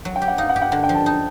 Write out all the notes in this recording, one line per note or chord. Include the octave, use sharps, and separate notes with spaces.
F#3
G5
G4
F#5
D#4 F5
F#5
G4
F#5
D3 F#5
G5
F3
A5
D#4 A5